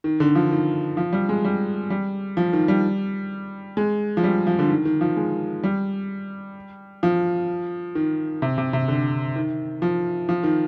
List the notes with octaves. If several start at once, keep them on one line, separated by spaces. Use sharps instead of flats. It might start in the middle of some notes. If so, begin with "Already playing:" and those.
D#3
D3
F3
D#3
F3
G3
G#3
G3
G3
F3
D#3
G3
G#3
F3
G3
F3
D3
D#3
D#3
F3
G#3
G3
F3
D#3
C3
C3
C3
D3
D#3
F3
F3
D#3